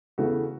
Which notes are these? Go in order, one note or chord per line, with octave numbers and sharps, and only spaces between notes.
E2 C#3 E3 A3 F#4